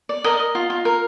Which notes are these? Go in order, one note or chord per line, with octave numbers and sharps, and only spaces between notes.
D5
A#4 D#5
D#5
F4
F4
A#4